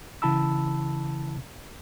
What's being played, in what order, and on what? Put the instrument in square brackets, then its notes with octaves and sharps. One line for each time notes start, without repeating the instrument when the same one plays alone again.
[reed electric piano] C#3 E3 E4 A5 B5 E6